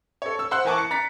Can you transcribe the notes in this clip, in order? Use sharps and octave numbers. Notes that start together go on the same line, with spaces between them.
A4 C#5
E6
C5 F#5 C6 E6 F#6
E3 A#4 G#5 A5 C#6 D6
C#7
A#5 A6 B6 C#7